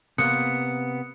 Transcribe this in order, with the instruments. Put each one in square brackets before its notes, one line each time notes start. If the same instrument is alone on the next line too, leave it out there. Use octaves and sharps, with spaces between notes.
[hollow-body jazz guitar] C3 A#3 B3 [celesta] D#6 F#6 C#7